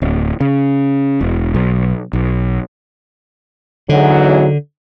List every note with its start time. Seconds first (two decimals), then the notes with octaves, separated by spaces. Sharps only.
0.02 D1
0.40 C#3
1.21 E1
1.55 B1
2.13 B1
3.89 E2 G#2 D3 F#3